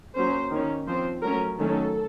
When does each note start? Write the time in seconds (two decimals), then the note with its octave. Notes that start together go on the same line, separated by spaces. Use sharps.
0.15 F#3 A#3 C#4 C5
0.51 D#3 A#3 C#4
0.87 F3 C4 C5
1.22 F#3 A3 C#4 A#4
1.59 D#3 F#3 A3 C#4 A4